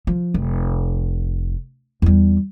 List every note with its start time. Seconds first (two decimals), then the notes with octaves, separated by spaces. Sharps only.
0.07 F3
0.34 F1
2.02 E2 G3